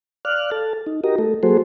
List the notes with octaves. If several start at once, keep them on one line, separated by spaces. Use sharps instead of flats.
D5 F5 F6 F#6
A4 A5
D#4
F#4 G4 A#4 D#5 A#5
A3 A4
F#3 A#3 F#4 G#4 A4 C5